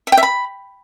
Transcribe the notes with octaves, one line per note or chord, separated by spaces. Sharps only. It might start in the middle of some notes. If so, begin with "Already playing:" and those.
E5
G5
E5
B5